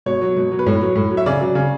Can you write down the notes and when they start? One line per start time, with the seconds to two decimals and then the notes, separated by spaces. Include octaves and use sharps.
0.06 B2 C#5
0.21 F#3
0.36 B2
0.52 F#3
0.59 B4
0.66 A2 C#5
0.81 F#3
0.95 A2
1.11 F#3
1.17 E5
1.26 C#3 D5
1.41 F#3
1.55 C#3